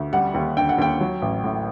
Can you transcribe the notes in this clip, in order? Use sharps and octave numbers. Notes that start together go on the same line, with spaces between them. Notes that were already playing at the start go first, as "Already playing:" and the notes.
Already playing: D2
G3 F#5
D#2
D3 G5
F#5
D#2 G5
F#3
A1
A2